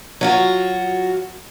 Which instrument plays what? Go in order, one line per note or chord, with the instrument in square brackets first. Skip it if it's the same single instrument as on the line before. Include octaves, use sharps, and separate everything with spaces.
[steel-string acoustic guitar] F#3 F4 F#4